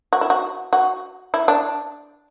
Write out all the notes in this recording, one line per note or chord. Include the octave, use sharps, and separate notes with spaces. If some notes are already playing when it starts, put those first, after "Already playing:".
F#4
E4
F#4
F#4
E4
D4